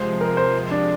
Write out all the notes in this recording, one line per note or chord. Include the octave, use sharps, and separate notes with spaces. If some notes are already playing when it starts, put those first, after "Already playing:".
Already playing: C3 F3 G#3 C5
A#4
C5
D4